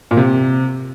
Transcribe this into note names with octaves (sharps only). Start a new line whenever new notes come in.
A#2
C3